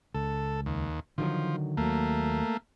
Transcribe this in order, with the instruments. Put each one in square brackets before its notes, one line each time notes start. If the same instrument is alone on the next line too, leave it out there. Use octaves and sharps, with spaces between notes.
[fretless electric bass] C#2 [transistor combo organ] A4
[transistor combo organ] D#2
[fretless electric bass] D3 D#3 F#3 [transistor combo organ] F3
[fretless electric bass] D#2 F#3 [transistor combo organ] A3 A#3